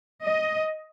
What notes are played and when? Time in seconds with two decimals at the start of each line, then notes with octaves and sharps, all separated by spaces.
0.23 D#5